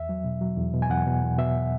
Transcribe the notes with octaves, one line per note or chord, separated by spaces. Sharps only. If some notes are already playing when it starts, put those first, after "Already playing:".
Already playing: E2 E5
F#3
B2
F#3
E2
B2
G#5
E2 F#5
B2
E2
B2 E5